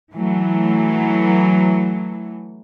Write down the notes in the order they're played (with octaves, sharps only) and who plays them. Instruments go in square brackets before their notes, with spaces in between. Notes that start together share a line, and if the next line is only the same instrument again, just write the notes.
[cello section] E3 F#3 A3